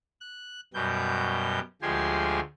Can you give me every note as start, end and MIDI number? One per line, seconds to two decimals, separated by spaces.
0.21 0.61 90
0.74 1.59 42
0.74 1.59 47
0.74 1.59 55
0.74 1.59 91
1.82 2.40 38
1.82 2.40 53
1.82 2.40 56
1.82 2.40 67
1.82 2.40 80
1.82 2.40 84